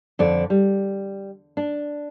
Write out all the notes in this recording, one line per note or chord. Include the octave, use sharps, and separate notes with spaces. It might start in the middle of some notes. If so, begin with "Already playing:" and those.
F2 D3 D5
G3
D4